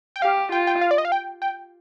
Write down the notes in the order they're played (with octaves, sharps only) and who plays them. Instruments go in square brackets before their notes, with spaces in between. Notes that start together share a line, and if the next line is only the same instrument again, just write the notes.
[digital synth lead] G5
[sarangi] G4 [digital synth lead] F5
[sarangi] F4 [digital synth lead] G5
[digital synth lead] G5
F5
D5
D#5
F5
G5
G5